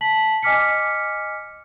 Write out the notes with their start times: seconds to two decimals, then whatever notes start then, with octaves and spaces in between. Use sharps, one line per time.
0.01 A5 B6 F#7
0.43 D#5 G#5 D6 F6 B6 C#7